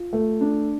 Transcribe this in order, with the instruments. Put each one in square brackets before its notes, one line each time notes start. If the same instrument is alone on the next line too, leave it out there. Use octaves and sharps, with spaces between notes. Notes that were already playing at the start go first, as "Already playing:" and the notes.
Already playing: [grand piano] F4
A3
D4